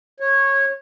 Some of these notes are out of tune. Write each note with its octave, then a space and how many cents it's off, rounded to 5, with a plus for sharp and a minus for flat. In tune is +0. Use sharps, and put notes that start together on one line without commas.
C#5 -15